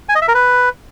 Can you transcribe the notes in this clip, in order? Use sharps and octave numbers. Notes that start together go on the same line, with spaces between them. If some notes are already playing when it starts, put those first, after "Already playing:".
G#5
D#5
E5
A#4
B4